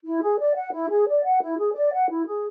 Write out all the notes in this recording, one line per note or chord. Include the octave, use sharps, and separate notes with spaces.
E4
G#4
D5
F#5
E4
G#4
D5
F#5
E4
G#4
D5
F#5
E4
G#4